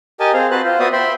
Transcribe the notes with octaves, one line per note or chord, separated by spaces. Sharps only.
G4 A#4 D#5 G#5 A5
C4 G#4 C5 F5
C4 F#4 B4 C5 A5 F#6
F4 C5
B3 F#4 C5 D5 E5 D#6
C5 E5 G5 B5 C6